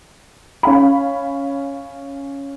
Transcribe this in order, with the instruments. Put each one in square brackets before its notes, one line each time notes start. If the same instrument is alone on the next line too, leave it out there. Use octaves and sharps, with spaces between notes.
[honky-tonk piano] C#4 F5 B5